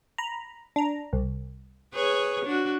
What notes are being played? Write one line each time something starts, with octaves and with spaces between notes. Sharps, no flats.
A#5 B5
D4 A#5
C2
G#4 B4 C#5
D4 F#4